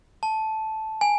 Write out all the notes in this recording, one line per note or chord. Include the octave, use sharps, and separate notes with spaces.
A5
G#5